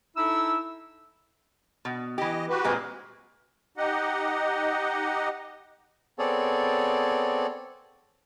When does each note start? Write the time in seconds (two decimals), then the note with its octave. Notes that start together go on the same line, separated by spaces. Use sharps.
0.16 D#4 E4 A4 E6
1.85 B2
2.18 E3 G4 D#5
2.49 F#4 G4 B4
2.64 A#2 G#3 C4
3.77 D#4 G4 D#5 F#5
6.19 B3 C4 G#4 A4 C#5 D5